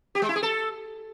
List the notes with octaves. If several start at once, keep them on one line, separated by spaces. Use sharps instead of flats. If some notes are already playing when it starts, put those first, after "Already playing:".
G4
G#3
E4
G#4
A4